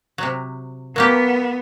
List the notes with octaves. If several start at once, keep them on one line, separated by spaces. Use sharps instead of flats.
C3 F#3
F#3 A#3 B3 G4 A#4